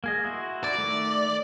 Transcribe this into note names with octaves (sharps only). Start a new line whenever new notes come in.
A#3 G#4 D#5
E4 F#4 C6
D5
D#3 A3